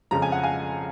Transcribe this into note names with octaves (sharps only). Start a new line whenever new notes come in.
F2 C#3 F3 A#5
G#5
F#5
F5 G#5